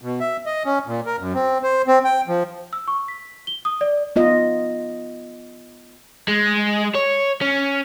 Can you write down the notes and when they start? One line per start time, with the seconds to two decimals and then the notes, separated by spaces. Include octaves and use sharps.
0.02 B2
0.20 E5
0.46 D#5
0.66 C#4
0.87 A#2
1.06 A#4
1.19 F#2
1.35 C4
1.63 C5
1.88 C4
2.04 G5
2.28 F3
2.73 E6
2.88 C#6
3.08 B6
3.47 G7
3.65 D#6
3.81 D5
4.16 B3 F4 D#5
6.28 G#3
6.95 C#5
7.41 C#4